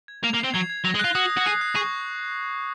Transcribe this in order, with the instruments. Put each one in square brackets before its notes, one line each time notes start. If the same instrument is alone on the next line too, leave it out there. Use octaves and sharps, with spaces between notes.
[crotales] G#6
[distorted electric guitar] A#3 [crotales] F7
[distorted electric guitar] A#3
[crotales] C7
[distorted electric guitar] C4
[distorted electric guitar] F#3 [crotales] G#6
[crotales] G#6
[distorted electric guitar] F#3 [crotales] A#6
[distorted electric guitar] G#3
[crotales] F#6
[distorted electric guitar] F4
[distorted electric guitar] F#4 [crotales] D#6
[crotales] D#6
[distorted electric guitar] F#4
[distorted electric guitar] G#4 [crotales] C7
[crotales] F#6
[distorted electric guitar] G#4 [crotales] C#6